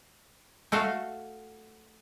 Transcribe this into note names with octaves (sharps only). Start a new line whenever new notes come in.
A3 F#4 A4 F5